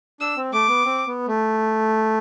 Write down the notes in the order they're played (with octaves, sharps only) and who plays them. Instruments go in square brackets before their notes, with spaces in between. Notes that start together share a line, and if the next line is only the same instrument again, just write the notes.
[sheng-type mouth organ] D4 [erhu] E6
[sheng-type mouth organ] C4
[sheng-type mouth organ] A3 [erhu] D6
[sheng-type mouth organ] B3
C4
B3
A3